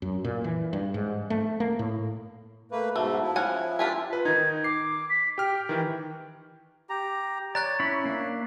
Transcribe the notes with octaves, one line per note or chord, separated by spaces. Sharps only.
F#2
A#2
E3
G2
G#2
A3
A#3
A2
A3 A#3 B4
G#2 B2 A3
F3 E4
C#4 F#5 G#5
D4 F4 G4 A#4 E5 G#5
F4 B4
D#3 D#4 G#6
D6 C7
B6
G4 G5 F6
D#3 E3
G4 A#5
C#5 D5 A#5 F#6 A6
C#4 E4 B5
A#3 D4